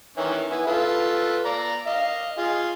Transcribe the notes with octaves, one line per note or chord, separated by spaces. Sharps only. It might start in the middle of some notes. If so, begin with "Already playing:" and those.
D#3 E3 C#4
B3 E4 G#5
F4 A4 B4
D5 A#5
D#5 F5
F4 G#4